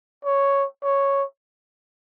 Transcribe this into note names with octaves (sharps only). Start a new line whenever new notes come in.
C#5
C#5